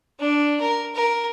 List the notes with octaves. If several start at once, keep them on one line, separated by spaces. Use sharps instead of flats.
D4
A#4
A#4